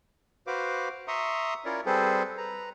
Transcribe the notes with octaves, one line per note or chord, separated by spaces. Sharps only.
F#4 B4 C5 F5 D6
E5 A#5 C6 C#6 D#6
C#4 E4 F4 A#4 C#5 D5
G3 C4 G#4 A4 B4 C5
B4 A#5